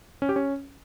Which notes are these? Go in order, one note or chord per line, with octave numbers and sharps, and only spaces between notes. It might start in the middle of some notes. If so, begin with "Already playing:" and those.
C#4
G4
C#4